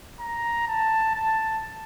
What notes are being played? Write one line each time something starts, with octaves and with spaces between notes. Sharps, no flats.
A#5
A5
A5